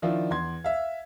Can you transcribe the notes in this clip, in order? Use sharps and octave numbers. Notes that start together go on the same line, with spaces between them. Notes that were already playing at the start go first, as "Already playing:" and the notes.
D#3 F3 D4 E4 F4
E2 C6 G#6
E5 F5